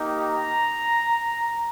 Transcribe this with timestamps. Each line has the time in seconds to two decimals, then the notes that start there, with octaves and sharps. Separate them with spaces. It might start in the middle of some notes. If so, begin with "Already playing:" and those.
Already playing: A#3 D#4 G4
0.23 A#5